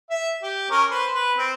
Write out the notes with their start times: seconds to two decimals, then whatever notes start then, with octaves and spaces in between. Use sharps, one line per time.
0.10 E5
0.43 G4
0.71 C#4 A#4
0.91 B4 C5 C6
1.14 B4
1.38 C4